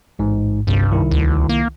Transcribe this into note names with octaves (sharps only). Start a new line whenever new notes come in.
A1 G#2
G1 C2 G2 C3
C2 D#3 E4
D2
A#3